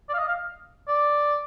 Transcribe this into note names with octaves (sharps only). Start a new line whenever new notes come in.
D5
F5
D#5
F5
D5